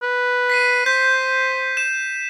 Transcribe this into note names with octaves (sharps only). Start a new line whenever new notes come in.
B4
B6 C7 D#7
C5 G6 B6
G6 E7